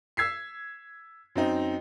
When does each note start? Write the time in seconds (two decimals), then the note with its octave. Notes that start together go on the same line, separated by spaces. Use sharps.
0.17 E6 G#6 B6 C7
1.36 F#2 C4 D#4